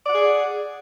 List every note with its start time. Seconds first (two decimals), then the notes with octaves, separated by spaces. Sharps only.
0.06 D5
0.09 F#5
0.13 G#4